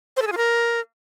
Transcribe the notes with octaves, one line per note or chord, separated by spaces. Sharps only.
C5
A4
G#4
F4
A#4